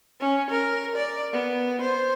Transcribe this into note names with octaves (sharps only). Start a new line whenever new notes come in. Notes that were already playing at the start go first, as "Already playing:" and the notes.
C#4
A#4
D5
B3
C5